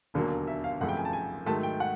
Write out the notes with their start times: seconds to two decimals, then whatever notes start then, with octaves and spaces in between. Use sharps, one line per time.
0.14 E1 D#2 D3 F#3 A#3
0.47 E5
0.64 F5
0.81 G#1 F#2 C#3 F3 A3 F#5
0.89 G5
0.97 G#5
1.05 A5
1.13 G#5
1.46 G#2 D#3 F#3 A3 A5
1.63 G5
1.80 F#5